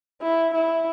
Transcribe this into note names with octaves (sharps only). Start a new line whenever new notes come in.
E4
E4